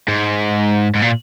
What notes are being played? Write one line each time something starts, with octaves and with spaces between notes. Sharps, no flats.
G#2
G#2
A#2